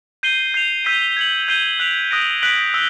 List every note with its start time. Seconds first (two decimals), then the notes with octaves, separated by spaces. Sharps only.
0.23 G6 C7 D#7 G7
0.54 G6 C7 F7
0.85 E6 G6 B6 D#7
1.17 G#6 C#7 F#7
1.48 G6 C7 D#7 G7
1.79 F#6 B6 D7 F7
2.11 D#6 F#6 A#6 D7
2.42 F#6 B6 D7 F#7
2.74 E6 B6